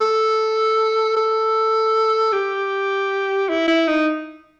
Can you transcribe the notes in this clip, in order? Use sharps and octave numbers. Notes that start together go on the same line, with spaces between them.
A4
A4
G4
E4
E4
D#4